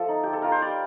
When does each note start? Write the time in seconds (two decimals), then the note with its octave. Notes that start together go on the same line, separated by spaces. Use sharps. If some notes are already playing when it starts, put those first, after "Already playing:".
Already playing: F3 A3 A4
0.09 D#4
0.23 F4 G4
0.33 A4
0.42 F4 A#4
0.52 C5
0.62 G3 D5